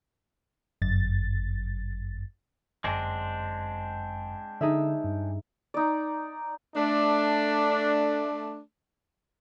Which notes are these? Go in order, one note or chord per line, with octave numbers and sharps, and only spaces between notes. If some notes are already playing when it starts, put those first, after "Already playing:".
G1 F#2 A6
G1 F#2 G#3 C4 D4 A#6 D#7
D3 D#4 G#4 E5
G2
D#4 D5
A3 D4